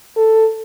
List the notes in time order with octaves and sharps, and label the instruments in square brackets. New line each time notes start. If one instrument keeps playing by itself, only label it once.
[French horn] A4